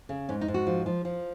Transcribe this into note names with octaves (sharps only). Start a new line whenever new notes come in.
C#3
G#2 C#4
D#4
G#2
F#4
F3
F3
F3